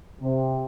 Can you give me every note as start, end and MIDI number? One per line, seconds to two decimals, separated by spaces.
0.20 0.62 48